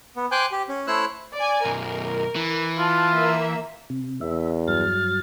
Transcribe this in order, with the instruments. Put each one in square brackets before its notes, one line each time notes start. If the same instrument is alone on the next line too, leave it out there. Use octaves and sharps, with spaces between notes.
[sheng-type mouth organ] B3
C5 G5 G#5 D6 F#6 G6
G4
C#4
A3 E4 C5 C#5 E6 F#6
[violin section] D5 G#5
[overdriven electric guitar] B1 F#2 [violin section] A#4
[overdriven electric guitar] E3
[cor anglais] F4 [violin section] A5
[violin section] A#3 E5
[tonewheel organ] C3
[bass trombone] E2 [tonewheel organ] E5
[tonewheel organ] G2 F#3 A6 [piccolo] F6